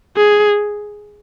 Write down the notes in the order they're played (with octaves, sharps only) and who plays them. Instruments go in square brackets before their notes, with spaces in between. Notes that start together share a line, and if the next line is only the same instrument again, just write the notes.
[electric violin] G#4